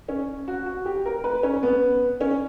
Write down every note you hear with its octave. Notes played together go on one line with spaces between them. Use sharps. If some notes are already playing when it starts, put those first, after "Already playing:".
C#4
F#4
F#4
G4
A#4
B4
C#4
B3
C#4